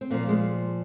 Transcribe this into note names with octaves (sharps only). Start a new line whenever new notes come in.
C4
A#2 F3 A#3
G#3